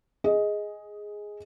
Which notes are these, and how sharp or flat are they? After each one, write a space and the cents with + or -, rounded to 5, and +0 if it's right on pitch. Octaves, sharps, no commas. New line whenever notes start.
G#4 +0 D#5 +10